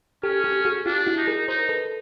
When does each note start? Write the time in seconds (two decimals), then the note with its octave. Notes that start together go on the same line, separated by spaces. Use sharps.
0.23 C#4 G4 A4
0.44 G4 A4
0.65 F#4 G#4
0.86 D4 F4 G4
1.06 E4 F#4
1.17 D#4
1.27 G#4 A#4
1.48 D#4 A#4 C5
1.69 A4 B4